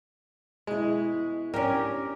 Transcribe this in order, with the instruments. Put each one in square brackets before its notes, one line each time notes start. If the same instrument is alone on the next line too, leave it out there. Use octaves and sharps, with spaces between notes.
[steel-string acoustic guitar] B2 E4 [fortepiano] G#3
[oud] C#4 G4 [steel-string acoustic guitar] D4 G#5 [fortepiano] A#4